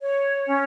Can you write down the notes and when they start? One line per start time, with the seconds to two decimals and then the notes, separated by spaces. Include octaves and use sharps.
0.01 C#5
0.45 C#4